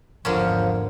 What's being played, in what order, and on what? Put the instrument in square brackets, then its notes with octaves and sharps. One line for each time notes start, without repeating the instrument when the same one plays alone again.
[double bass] G#1 E2 [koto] D3 A#3 C#4 [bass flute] F3